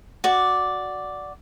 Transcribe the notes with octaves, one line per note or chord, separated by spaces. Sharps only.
F#4 D5